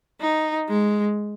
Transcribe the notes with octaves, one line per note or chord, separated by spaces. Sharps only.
D#4
G#3